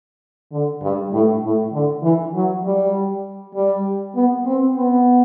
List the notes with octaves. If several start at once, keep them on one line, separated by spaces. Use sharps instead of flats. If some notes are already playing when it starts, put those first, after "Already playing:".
D3
G2
A2
A2
D3
E3
F#3
G3
G3
B3
C4
B3